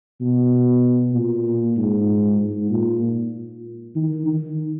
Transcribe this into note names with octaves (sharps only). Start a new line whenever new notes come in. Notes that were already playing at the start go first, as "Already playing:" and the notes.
B2
A#2
G#2
G#2
A#2
D#3
D#3